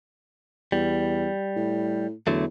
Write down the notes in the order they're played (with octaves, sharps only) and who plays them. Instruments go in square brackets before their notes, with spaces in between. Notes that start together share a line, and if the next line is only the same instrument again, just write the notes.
[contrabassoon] E2 [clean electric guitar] G3
[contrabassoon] A2
[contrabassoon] E2 [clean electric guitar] D3 F#3 A3